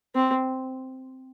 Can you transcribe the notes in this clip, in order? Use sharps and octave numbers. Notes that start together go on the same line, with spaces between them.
C4